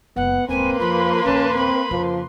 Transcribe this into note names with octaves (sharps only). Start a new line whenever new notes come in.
F#1 C#2 B3 F#5
D#1 G#2 A#3 C4 B4 G#5 C6
F2 F3 B5
A#1 D#2 C#4 A5
C4 B5
F2 C#3 F3